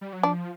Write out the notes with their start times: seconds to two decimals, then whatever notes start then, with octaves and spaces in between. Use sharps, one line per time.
0.01 G3
0.13 F#3
0.23 F3 D4